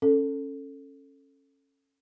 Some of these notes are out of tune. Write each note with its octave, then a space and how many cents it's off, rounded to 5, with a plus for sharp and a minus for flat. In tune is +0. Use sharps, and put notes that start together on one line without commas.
C#4 -15 A4 +10